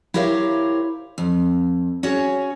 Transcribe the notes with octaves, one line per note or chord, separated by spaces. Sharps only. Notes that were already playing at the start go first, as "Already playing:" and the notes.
E4 G4 A#4 C5 C#5 F5
F2
C#4 F#4 G#4 C#5